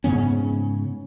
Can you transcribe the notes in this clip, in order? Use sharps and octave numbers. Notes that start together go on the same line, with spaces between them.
G#2 C#3 B3 C#4